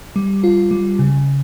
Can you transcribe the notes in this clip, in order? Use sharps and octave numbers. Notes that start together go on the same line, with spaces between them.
G3
F4
G3
C#3